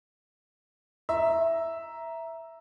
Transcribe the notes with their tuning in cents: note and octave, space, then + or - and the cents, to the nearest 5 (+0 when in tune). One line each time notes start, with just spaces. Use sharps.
E5 +0 A#5 +5